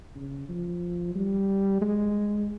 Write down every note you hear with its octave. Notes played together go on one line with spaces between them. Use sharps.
C#3
F3
G3
G#3